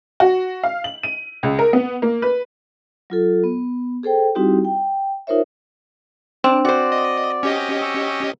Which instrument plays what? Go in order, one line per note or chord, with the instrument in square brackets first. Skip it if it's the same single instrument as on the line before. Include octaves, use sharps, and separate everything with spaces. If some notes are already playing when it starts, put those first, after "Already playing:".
[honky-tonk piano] F#4
F5
F#7
D#7
C#2
A#4
B3
A#3
B4
[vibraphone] F#3 F4 A4
B3
G#4 A4 C5 G5
G3 C4 D#4 E4 F#4 G4
G5
D#4 F4 A#4 C5 C#5 E5
[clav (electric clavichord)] C4 [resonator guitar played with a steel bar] D4
[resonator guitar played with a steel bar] F#4 C5 [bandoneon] D5
[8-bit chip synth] D#5
C#4 G4 D#5
[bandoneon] C#6 E6